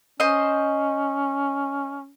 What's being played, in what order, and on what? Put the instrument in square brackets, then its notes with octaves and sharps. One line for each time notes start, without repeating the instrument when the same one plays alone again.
[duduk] C#4 [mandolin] C5 D#5